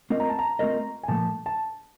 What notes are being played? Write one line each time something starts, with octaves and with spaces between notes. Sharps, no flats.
A3 C4 F4 A#4 D#5
A#5
A5
A#5
A3 C4 F4 A#4 D#5
G#5
A#2 F3 A3 A5
A5